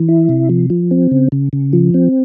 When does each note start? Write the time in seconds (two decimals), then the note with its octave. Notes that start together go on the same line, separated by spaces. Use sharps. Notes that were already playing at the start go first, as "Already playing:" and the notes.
Already playing: E3
0.08 E4
0.29 C3
0.49 F3
0.70 F3
0.91 C4
1.11 C#3
1.32 C#3
1.53 C#3
1.73 F3
1.94 C4